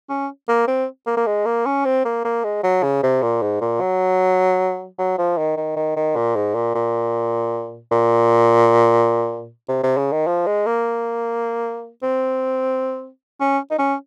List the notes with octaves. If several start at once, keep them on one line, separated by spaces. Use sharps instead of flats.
C#4
A#3
C4
A#3
A#3
G#3
A#3
C#4
C4
A#3
A#3
G#3
F#3
C#3
C3
A#2
G#2
A#2
F#3
F#3
F3
D#3
D#3
D#3
D#3
A#2
G#2
A#2
A#2
A#2
C3
C3
C#3
D#3
F3
G#3
A#3
C4
C#4
D#4
C#4